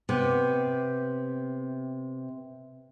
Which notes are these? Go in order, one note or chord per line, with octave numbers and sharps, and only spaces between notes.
C3 B3